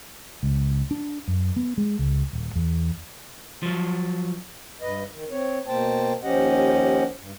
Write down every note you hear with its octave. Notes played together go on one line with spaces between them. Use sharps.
C#2
D4
F#2
B3
G#3
C#2
D#1
E2
F3 F#3
G2 B4 D#5
D#3
C4 C#5
B2 A#3 C5 G5 A5
D#2 F3 C#4 G4 D#5 F#5
G2